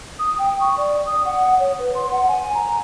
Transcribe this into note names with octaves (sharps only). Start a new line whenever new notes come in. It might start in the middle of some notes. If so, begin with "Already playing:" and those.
D#6
G5
C#6
D5
D#6
F#5
C#5
B4
C6
F#5
G#5
A#5